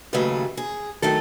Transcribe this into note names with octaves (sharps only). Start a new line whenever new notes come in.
D#2 C#3 F#3 A3 B4
G#4
D#3 F#3 A3 A4